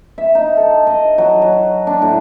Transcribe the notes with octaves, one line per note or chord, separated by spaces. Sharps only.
E5
D#4
A4
D#5
F#3
F#3
D4
A2